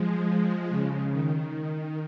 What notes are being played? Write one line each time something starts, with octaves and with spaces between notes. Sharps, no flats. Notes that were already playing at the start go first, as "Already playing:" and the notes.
Already playing: F3 G#3
C#3
D#3